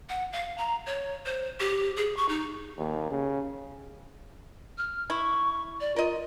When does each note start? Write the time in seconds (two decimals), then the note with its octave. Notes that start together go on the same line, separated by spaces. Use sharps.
0.09 F#5
0.33 F5
0.58 A#5
0.86 C#5
1.26 C5
1.60 G4
1.97 G#4
2.17 C#6
2.29 D#4
2.78 D#2
3.10 C#3
4.78 F6
5.10 E4 C#6
5.80 D5
5.96 F4 A#4 D#5